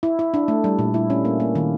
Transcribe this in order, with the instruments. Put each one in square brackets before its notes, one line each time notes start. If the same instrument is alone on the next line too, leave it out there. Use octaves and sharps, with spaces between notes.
[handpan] E4
E4
D4
A3
G3
A#2
E4
C#4
A#3
A#3
D#3